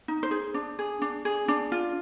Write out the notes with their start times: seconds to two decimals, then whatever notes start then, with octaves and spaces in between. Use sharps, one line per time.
0.08 D#4
0.23 C5
0.31 G#4
0.54 D4
0.79 G#4
1.02 D4
1.25 G#4
1.48 D4
1.72 F4